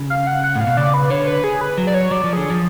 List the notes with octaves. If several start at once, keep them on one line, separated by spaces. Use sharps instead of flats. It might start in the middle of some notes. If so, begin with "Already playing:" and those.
Already playing: C#3
F5
F#5
F#5
A2
F5
B2
C#3 D5
B4
D3 C#5
B4
G#4
B4
F#3
D5
C#5
F#3 D5
F3
D3 G#4
F3